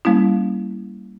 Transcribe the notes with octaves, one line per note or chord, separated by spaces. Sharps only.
G3 A#3 C#4 E4